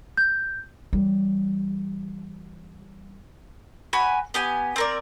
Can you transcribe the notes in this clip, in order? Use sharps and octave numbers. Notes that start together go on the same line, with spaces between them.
G6
E3 G3
F#4 G#5 B5
B3 G4 G#5
C4 A#4 D5